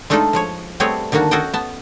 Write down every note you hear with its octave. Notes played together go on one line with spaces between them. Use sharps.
G#3 A3 D4 D#4 F4 A4
F3 G#3 C#5
G3 A3 B3 C4 G#4 C#5
D3 D#3 A#3 D4 F#4
C#4 F#4 A4 D#5 F#5 G5
B3 A5